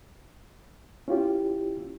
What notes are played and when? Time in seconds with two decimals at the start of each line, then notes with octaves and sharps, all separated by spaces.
1.08 C#4 E4 F4 G4